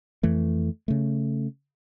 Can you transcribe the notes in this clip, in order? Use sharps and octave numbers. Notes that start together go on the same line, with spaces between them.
F2 E3 A3
C#3 A3